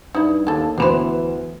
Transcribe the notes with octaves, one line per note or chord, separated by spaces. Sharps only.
G2 D#4 E4
D#2 A#3 A4
D2 E3 B3 D4 B4 C5 E7